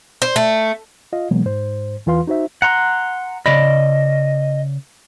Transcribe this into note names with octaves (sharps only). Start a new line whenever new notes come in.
C5
A3
F4 D#5 F5
B2 E3 F#3 G#3 A#3 B3
G#2 C5
E2 E3 F4 B4 F5 C6
D#4 F#4 C5 E5
F#5 A#5 C6
C#3 D5 D#5 B5